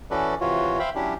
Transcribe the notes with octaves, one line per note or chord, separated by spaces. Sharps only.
E3 C#4 F#4 A4 B4 D5
C3 E3 F4 F#4 C#5
C5 E5 F5 G5 B5
F#3 C#4 D4 E4 G4